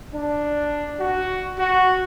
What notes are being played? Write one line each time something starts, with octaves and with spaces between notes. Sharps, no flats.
D4
F#4
F#4